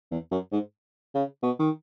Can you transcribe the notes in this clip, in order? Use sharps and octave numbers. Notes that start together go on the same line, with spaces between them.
E2
F#2
G#2
C#3
B2
D#3